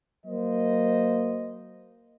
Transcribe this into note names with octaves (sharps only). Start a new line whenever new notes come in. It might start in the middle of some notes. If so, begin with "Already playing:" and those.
F#3 A#3 C5 D#5